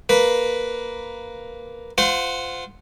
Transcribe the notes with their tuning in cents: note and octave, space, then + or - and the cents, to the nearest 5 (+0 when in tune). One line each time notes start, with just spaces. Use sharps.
A#3 +0 B4 +0
F4 +0 C5 -30 F#5 +0